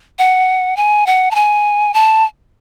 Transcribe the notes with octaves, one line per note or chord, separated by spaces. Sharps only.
F#5
G#5
F#5
A5
G#5
A5